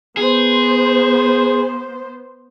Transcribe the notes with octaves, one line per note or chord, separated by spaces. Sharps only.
B3 G#4 C5